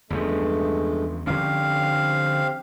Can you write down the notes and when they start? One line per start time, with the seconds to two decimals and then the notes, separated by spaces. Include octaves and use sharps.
0.10 E2 G2 C#3 F3 G#3 A3
1.27 D3 F3 C4 C#4 G4 C5 F5